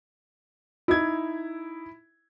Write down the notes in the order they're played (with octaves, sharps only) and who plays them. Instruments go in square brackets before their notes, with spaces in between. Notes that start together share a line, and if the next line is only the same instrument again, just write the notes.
[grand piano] D#4 G#6 [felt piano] E4